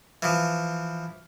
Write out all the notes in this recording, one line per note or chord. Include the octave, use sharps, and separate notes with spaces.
E3 F3